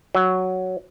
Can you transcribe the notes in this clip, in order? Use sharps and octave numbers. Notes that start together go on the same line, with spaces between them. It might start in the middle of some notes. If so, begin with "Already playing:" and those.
F#3